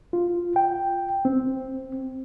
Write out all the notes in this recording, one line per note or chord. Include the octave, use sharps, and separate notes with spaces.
F4
G5
C4